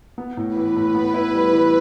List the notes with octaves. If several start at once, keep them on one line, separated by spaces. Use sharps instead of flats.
B3
A2
E3 B4
A2
B3
E4
G3
E3